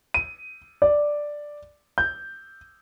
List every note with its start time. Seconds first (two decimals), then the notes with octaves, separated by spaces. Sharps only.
0.14 D#7
0.82 D5
1.98 G6